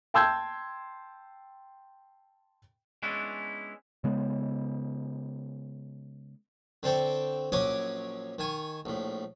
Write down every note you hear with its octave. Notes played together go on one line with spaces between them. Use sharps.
G5 A5 C6 E6 G6 G#6
G#3 B3 C#4 D4 E4
C#3 G#3 B3
D3 C4 A4 G5 C#6
A#1 F#3 C#4 C#5 D6 D#6
D#3 G#5 C#6
A#1 A2